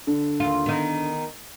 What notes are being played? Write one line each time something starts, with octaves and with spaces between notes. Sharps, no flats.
D3
D#2 F4
D#3 B3